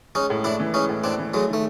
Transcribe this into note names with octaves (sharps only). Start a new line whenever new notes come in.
G#3 C#4 D#4
A2
A2 D4 E4
E3
G#3 C#4 D#4
A2
A2 C4 D4
E3
F#3 G#3 A3
D#3 A3